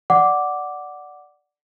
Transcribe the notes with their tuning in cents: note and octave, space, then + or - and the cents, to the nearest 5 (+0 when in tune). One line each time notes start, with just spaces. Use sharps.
D5 +0 F#5 +0 D6 -5